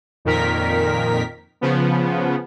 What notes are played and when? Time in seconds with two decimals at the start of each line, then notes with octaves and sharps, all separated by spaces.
0.25 F2 A#2 D#3 A#4 B6
1.61 C#3 F3 B3